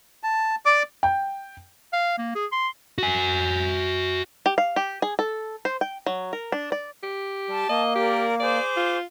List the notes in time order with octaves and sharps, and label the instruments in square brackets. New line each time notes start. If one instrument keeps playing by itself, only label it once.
[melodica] A5
D5 D6
[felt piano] G5
[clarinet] F5
A#3
G#4
C6
[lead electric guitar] F#4 G#5
[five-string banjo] G4
F5
G4
G#4
A4
C5
G5
F#3
A#4
D4
D5
[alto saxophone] G4
[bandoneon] G3 [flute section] A5
[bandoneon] A#3 [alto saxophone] D#5
[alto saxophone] G4 [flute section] A#4 D5
[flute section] G#4 C5 D6 [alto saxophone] D5
[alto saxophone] F4